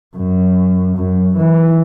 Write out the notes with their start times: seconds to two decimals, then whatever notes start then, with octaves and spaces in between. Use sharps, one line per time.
0.17 F#2
0.97 F#2
1.37 E3